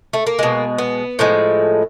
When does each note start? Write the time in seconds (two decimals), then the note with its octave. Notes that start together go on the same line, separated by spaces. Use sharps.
0.13 A3
0.26 A#3
0.39 B2 G#3
0.78 B3
1.19 A2 F3 G#3